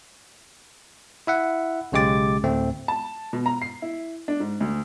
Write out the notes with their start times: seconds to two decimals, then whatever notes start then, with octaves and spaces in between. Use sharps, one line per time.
1.27 E4 E5 F#5
1.92 B1 C#3 G#3 G4 D6 A6
2.44 D2 A2 A3 C4
2.88 A5
3.33 B2
3.46 A#5
3.62 C7
3.82 E4
4.28 D4
4.40 G#2
4.60 D2